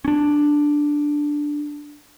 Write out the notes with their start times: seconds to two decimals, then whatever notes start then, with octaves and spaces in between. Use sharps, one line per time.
0.05 C#4 D4